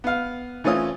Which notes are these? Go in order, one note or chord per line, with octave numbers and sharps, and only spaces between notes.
B3 F5
E3 A3 C4 C#4 F4 D#6